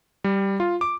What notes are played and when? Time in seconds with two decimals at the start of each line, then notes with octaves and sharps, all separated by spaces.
0.24 G3
0.60 F4
0.81 D6